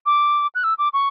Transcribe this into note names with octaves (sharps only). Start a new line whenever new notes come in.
D6
F#6
E6
D6
C#6